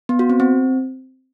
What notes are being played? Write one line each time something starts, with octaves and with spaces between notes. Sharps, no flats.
B3
F#4
C4
C4